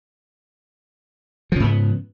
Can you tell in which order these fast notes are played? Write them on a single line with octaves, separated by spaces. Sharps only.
F3 C#3 G#2 B3